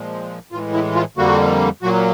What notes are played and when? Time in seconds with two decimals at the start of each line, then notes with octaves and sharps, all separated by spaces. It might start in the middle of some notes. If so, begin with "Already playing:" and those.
Already playing: A#2 F3 G#3
0.52 A2 E3 G#3 F4
0.73 E4
0.95 F4
1.17 F2 D3 G3 A#3 F#4
1.82 A#2 F#3 A#3 F#4